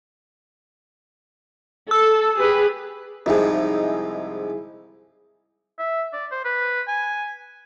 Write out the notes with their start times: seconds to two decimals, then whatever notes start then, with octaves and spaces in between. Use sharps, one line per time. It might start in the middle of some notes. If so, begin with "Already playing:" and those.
1.91 A4 E6
2.37 G4 G#4 B4
3.26 C2 G#2 F3 D#4 E4 G#4
5.79 E5
6.13 D5
6.32 C5
6.45 B4
6.88 G#5